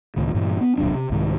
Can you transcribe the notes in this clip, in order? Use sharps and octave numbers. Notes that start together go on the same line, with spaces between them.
C#2 A2 D#3
G2 A#2 E3 G3
B3
D1 B1 F2 D4
C3
C2 G#2 D#3